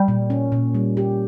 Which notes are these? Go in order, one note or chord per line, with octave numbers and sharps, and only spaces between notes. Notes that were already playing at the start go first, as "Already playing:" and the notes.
Already playing: G3
A#2
C#4
A#2
G3
G4